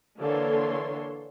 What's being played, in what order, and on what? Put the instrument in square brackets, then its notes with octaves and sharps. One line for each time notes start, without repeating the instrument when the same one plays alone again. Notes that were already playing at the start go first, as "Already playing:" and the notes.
[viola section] D3 E3 A#3 A4 C#5 C6